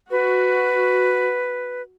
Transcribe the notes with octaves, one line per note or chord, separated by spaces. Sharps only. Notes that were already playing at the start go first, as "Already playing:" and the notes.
F#4 B4